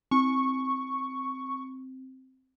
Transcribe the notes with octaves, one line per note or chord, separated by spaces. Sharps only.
C4 C#6